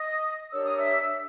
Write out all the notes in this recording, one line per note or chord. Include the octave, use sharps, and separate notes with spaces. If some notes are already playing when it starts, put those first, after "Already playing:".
Already playing: D#5 D#6
D4 G4 A#4 C#5 E6
D#6
E5 E6